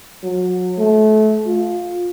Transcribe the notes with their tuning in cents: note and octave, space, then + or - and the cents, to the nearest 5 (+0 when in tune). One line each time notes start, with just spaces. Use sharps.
F#3 -30
A3 -30
F4 +15